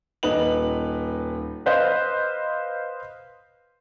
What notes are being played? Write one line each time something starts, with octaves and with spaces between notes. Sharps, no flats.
D#1 D#4 B4 F#7
B4 C5 D#5 F5